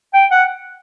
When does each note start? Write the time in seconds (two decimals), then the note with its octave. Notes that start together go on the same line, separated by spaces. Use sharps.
0.14 G5
0.31 F#5